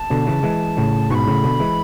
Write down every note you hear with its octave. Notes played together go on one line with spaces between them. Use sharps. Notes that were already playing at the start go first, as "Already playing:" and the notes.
Already playing: A5
B2 D3
C#3 E3
E3 G#3
A2 C#3
G#2 B2 B5 C#6
A2 C#3
B2 D3
E3 G#3